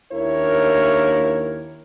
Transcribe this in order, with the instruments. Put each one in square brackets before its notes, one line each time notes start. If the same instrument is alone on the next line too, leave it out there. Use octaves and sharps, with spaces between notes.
[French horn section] D#2 A#3 D4 E4 A#4 C#5